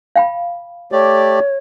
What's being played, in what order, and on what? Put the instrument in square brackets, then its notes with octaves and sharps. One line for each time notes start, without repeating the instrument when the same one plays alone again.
[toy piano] F5 G5 B5
[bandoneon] A3 G4 D5 [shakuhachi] C#5